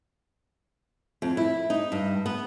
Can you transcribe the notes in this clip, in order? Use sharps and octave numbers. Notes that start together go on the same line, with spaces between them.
F2
E4
D#4
G2
B3